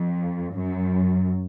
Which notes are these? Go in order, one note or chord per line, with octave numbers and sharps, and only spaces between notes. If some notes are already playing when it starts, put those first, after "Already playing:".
Already playing: F2
F#2